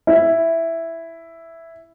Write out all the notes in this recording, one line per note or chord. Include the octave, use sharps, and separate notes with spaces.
E4